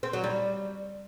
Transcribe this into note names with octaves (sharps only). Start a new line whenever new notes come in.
C4
F#3
G3